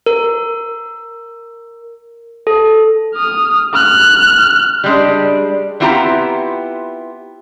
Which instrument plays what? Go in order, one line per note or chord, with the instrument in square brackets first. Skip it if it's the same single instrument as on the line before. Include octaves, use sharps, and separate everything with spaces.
[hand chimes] A#4
A4
[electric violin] D#6 F6
F6 F#6
[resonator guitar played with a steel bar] G3 G#3 D4
B3 C4 E4 F4 G4 A#5